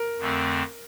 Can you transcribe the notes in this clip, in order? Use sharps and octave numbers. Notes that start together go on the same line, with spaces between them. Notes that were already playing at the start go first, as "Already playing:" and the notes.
Already playing: A#4
F2 D3 A3 C4